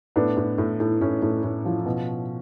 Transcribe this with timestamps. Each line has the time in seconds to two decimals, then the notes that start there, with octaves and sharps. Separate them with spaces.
0.16 A2 B3 D4
0.37 A2
0.58 A2
0.80 A2
1.01 A2 C#4
1.22 A2
1.43 A2
1.65 F3
1.86 B2